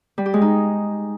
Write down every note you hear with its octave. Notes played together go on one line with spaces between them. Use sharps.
G3
G4
G#3
D#4